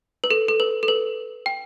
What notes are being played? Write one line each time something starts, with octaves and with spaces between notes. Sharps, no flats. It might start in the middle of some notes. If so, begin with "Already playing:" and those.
B4
A4
A4
B4
A4
B4
G5